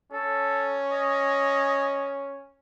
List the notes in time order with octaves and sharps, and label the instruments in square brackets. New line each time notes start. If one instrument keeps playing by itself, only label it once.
[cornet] C#4 [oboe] A4
[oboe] D#5